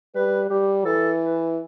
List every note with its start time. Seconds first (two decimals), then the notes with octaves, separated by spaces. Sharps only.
0.15 G3 B4
0.50 G3 G4
0.85 E3 A4
1.21 B4